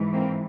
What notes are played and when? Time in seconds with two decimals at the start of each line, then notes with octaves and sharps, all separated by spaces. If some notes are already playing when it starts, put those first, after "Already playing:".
Already playing: G#2 E3
0.13 A#3 C4